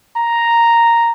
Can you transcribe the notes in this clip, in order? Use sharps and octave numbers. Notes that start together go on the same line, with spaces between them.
A#5